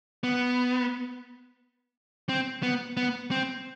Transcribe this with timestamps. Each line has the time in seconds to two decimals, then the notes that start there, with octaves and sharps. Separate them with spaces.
0.24 B3
2.29 C4
2.63 B3
2.97 B3
3.31 C4